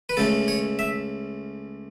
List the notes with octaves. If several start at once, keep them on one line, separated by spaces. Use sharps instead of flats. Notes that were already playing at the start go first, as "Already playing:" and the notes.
B4
C#2 C#3 A3 A4
C#5
E5